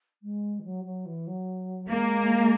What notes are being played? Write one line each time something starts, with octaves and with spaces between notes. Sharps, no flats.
G#3
E3
F#3
F#3
E3
F#3
G#3 A#3